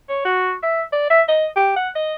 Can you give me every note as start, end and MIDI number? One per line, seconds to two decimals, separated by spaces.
0.09 0.24 73
0.25 0.53 66
0.63 0.82 76
0.93 1.10 74
1.10 1.21 76
1.29 1.46 75
1.56 1.74 67
1.76 1.89 78
1.96 2.14 75